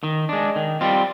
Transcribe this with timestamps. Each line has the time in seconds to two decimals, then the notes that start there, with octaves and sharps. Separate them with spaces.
0.03 D#3
0.29 G#3 D4
0.56 D#3
0.81 G3 C4 F4